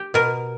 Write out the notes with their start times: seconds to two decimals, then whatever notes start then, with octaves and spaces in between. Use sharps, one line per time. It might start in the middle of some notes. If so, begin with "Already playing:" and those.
Already playing: G4
0.14 B2 A#4